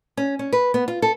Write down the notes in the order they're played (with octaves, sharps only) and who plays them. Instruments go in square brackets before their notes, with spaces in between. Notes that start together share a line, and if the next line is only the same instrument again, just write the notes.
[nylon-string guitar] C#4
C#4
B4
B3
F4
A4